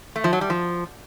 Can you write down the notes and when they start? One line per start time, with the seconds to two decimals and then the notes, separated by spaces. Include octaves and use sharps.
0.16 A3
0.24 F3
0.33 F#3
0.41 G3
0.50 F3